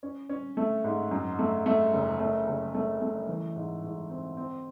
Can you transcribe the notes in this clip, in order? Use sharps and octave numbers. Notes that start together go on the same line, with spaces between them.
C#4
C#4
A3
G#2
F#2
A3
A3
F#1
A3
F#1
A3
A3
E3
G#2
G#2
C4
C4